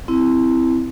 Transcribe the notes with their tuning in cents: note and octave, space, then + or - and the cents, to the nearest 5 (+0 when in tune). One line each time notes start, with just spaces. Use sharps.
C4 -10 E4 +0